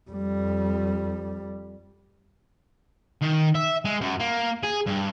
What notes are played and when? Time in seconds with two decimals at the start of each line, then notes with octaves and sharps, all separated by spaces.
0.10 F2 G3
3.21 D#3
3.55 E5
3.85 G#3
4.01 F#2
4.20 A#3
4.63 G#4
4.87 G2